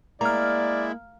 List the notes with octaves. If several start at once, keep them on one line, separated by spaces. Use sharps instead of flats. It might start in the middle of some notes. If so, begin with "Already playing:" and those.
G#3 A#3 E4 D5 A#5 F6